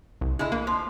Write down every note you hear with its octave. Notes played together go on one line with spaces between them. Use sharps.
C2
D3 G#3 E4
E3 A#3
F3